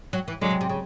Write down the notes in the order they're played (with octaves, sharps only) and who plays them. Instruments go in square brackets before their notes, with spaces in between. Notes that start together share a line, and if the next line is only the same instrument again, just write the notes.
[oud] F#3
E3
[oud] D3 [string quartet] F#3 G#3
[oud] C3
C3
C#3